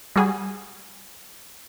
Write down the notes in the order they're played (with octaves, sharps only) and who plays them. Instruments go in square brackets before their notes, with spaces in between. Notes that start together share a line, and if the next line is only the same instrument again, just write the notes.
[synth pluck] G3 F#4 G#4